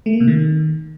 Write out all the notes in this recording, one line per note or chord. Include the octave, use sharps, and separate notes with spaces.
A3
A#3
C3
D#3